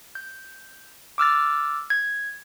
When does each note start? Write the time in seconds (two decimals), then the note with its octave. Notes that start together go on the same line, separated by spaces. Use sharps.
0.15 G6
1.18 D6 E6 F6 A6
1.90 G#6